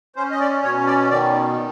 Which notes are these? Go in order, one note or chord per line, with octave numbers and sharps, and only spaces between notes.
C#4 C5
D#5
D5
B2 C#5
D5
D#3 D5